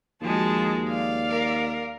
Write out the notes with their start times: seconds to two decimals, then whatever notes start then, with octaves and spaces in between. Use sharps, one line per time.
0.21 D#2 F3 G#3 F#4 A5
0.89 D5 F5
1.30 A#4